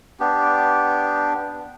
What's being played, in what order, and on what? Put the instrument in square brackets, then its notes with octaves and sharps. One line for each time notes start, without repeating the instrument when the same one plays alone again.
[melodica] B3 D4 G4